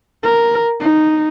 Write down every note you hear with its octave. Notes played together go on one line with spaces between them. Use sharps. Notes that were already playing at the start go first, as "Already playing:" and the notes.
A#4
D#4